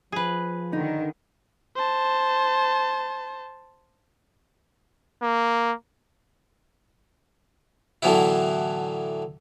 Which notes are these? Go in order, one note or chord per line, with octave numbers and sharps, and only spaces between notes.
F3 G#4 B4
D3 D#3 D#4
C5 A5
A#3
A2 D3 E3 F#3 B3 E4